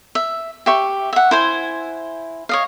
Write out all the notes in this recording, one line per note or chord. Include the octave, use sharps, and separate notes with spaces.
E5
G4 E5 C#6
E5 F#5
E4 C5 G#5
C#5 D#5 F5